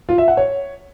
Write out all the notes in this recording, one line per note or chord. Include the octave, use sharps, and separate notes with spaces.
F4
E5
F#5
C#5